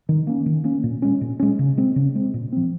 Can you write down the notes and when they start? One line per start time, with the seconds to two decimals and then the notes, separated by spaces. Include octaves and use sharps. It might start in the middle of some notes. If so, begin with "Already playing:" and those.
0.09 D#3
0.27 A#3 C#4
0.46 D#3
0.64 A#3 C#4
0.83 A#2
1.02 G#3 C#4
1.21 A#2
1.40 G#3 C#4
1.59 C#3
1.77 G#3 C4
1.96 C#3
2.15 G#3 C4
2.34 A#2
2.52 F3 C4